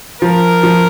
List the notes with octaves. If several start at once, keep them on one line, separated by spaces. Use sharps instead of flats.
F3 A#4
F3